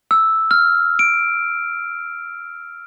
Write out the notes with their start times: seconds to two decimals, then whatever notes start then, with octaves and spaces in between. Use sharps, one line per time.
0.11 E6
0.51 F6
0.99 D7